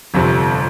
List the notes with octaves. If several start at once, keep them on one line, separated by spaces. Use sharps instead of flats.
G1 F2 C3